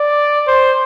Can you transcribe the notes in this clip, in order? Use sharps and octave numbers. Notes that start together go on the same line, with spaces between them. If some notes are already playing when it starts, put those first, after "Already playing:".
Already playing: D5
C5